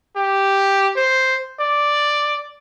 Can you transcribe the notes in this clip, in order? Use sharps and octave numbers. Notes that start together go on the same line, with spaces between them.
G4
C5
D5